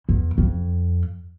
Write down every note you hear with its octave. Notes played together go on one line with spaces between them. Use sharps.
E2
F2